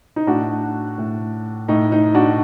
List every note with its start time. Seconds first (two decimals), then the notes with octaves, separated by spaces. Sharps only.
0.16 D#4
0.27 A2 D4 F#4
0.98 A2
1.68 A2 D#4
1.92 D#4
2.14 D4 F#4